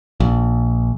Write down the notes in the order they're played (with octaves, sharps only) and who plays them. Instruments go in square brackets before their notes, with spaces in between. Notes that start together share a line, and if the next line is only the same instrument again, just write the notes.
[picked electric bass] A#1